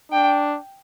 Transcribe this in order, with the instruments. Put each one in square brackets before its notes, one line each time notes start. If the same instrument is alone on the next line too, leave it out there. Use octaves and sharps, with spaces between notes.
[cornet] D4 [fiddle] G5